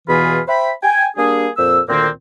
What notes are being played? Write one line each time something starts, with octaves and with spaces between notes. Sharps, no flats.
E2 B2 E3 F4 G#4 B5
C5 E5 G5 B5
G5 G#5
G3 A#3 D4 G#4
F2 A#2 C5 E6
D2 A#2 D#3 A#3 C4